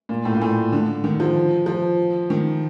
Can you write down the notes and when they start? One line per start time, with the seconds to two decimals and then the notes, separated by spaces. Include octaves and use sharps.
0.09 A#2
0.25 A2
0.35 A#2
0.42 A2
0.72 D3
1.04 D#3
1.20 F3
1.66 F3
2.30 D#3